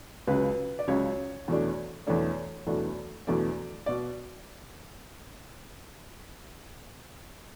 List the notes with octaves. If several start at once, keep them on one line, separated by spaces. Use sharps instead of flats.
C#2 C#3 F#3 B4
D5
C#2 C#3 F#3 C#5
E2 B2 F#3 A3 D4
E2 B2 F#3 A3 D4 C#5
E2 B2 F#3 A3 D4
E2 B2 F#3 A3 D4 D5
B2 D5